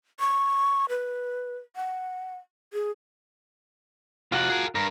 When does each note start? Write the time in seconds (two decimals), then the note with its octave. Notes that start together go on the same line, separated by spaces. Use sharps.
0.20 C#6
0.89 B4
1.76 F#5
2.73 G#4
4.32 F2 C3 F4 F#4 F#5
4.50 G#4 A#4
4.75 G2 A#4